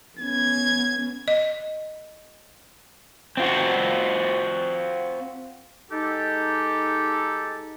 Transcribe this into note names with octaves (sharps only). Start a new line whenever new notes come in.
B3 C#4 G#6
D#5
C4 F4 F#4
G#3 D#4 G4 A4